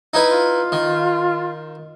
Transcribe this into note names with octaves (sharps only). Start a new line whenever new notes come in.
D#4 E4 B4
F4
D#3